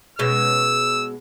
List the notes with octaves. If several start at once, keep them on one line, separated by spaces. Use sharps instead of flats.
B2 G#3 C#4 E6